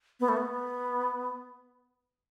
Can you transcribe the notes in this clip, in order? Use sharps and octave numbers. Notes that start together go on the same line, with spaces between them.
B3
A3
B3